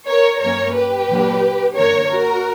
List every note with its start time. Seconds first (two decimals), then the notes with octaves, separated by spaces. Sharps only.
0.08 A#4 C#5
0.41 G2 F#3 A#3 C#4 A#4 C#5
0.75 G4 B4
1.08 A#2 F#3 A#3 D4
1.75 F#2 D3 A#3 D4 A#4 C#5
2.09 F#4 A#4